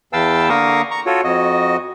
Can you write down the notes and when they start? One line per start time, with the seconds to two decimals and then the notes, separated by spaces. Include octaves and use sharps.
0.13 E2 B4 F5 G5 A5 E6
0.49 D3 A#3 A#4 F5 C#6 D#6
0.91 A#5 C#6
1.06 F4 F#4 A4 C#5
1.24 F2 F#4 D#5